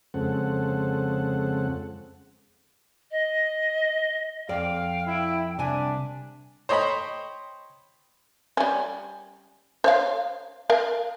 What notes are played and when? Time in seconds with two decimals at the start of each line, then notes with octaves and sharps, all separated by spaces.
0.14 F2 C#3 G#3 C4 A4 F#5
3.11 D#5
4.49 F2 D5 F5 G5
5.07 E4
5.59 C2 D4 E5 G#5
6.69 C5 C#5 D#5 G5 B5
8.57 G3 C#4
9.84 C5 C#5 F5
10.70 A#4 F5